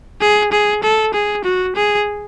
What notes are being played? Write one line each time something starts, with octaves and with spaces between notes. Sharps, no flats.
G#4
G#4
A4
G#4
F#4
G#4